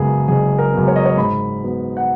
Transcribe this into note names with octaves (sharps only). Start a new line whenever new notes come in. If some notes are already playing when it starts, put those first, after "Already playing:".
Already playing: F#1 F#2 C#3 G#3 B3 G#4 A#4
F#1 G#4
A#4
F#2 C#3 G#3 B3
C#5
D#5
C#5
G#2 B5
F#3 B3
F#5